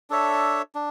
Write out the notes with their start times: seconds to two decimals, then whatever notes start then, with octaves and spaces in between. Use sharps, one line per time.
0.10 D4 A4 C#5 E5
0.75 D4